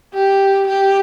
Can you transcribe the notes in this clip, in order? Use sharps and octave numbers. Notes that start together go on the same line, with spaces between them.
G4
G4